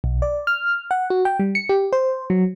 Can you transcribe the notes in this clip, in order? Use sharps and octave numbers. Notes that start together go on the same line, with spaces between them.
B1
D5
F6
F#5
F#4
G5
G3
C#7
G4
C5
F#3